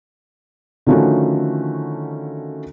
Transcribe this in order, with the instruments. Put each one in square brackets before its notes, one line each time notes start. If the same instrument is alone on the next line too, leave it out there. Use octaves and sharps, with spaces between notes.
[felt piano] D3 D#3 F3 A3 C#4 F#4